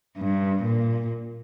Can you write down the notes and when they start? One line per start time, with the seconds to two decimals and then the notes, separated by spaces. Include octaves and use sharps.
0.17 G2
0.64 A#2